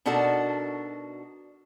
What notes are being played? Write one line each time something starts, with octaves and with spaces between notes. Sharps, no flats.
B2 D4 D#4 F#4 A4 A#4